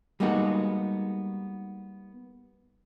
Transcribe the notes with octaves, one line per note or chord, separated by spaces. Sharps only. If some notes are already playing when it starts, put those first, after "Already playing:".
G3 G#3 A#3 B3 D#4 F#4